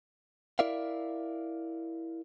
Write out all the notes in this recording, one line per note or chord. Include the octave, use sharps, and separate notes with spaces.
E4 A#4 D5 E5 F5